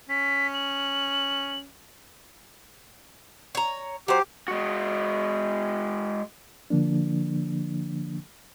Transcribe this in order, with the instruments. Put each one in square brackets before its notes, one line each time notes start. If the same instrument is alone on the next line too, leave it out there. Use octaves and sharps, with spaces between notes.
[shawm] C#4 [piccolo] B6
[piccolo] F#7
[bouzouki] C#5 A#5
[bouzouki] F#3 C5 [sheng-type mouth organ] G4
[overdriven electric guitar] G#3 F#4
[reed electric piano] D3 F3 A#3 D4